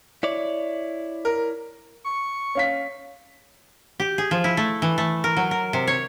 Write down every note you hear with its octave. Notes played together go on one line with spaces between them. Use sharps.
E4 C#5 D5
A#4
C#6
C#4 F5 B6
G4
G#4
F3
E4
A3
E3
A3
A#4
F#3
A#4
C3
C#5